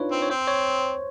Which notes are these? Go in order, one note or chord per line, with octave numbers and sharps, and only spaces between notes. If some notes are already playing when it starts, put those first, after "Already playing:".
Already playing: D4 D#4 F4 B4 C#5
C4
C#5
C4 C5
C#5